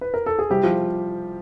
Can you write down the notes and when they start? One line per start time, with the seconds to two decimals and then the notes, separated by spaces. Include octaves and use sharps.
0.01 B4
0.14 A#4
0.26 A4
0.39 G#4
0.50 C3 G3 G4
0.63 F3 F4